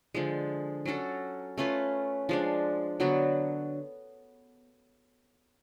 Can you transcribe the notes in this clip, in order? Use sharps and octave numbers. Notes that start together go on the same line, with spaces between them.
D3 F3 G#3
F#3 C#4 F#4 A4
A3 C#4 F4 B4
F3 G#3 D4
D3 F#3 B3 F#4